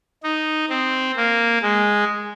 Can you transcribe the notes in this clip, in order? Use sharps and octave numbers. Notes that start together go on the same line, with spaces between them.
D#4
C4
A#3
G#3